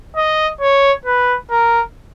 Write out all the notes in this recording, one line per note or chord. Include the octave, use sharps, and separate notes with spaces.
D#5
C#5
B4
A#4